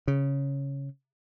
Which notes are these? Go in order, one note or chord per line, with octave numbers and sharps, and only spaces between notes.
C#3